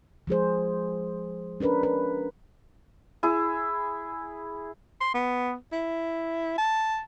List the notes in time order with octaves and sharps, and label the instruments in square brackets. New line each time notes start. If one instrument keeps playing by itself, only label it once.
[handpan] F3 G#3 G#4 C5
C#4 D4 A#4 B4
B4
[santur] E4 G#4
[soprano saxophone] C6
B3
E4
A5